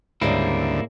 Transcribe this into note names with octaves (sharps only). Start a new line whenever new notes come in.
D2 G#2 C#3 G3 A#3 E4